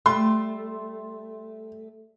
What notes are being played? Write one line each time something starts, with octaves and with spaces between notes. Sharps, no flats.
G3 A3 C6